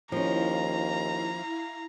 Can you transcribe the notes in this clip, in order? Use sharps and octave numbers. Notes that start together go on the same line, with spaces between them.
D#2 F3 C#4 E4 F5 A#5